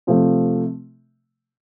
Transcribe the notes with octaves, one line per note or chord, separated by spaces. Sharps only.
C3 F3 A3